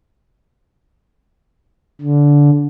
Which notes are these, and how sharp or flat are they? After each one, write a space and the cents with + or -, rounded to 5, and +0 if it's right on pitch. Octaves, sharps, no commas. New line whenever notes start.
D3 -20